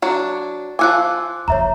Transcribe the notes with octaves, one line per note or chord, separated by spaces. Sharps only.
F#3 D4
F3 F#4 G#5 D6 E6 F#6
F#1 F2 C#5 E5 A#5